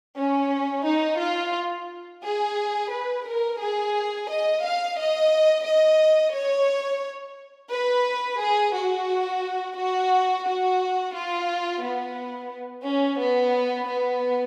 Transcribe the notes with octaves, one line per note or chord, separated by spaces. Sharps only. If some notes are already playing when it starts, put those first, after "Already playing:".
C#4
D#4
F4
G#4
B4
A#4
G#4
D#5
F5
D#5
D#5
C#5
B4
G#4
F#4
F#4
F#4
F4
B3
C#4
B3
B3